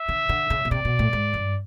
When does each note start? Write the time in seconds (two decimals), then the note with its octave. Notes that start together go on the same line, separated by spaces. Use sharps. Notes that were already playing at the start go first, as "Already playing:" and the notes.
Already playing: E5
0.08 D3
0.29 D3
0.50 C#3
0.65 B2
0.71 C3 D5
0.85 B2
0.99 A2
1.13 G#2
1.34 G2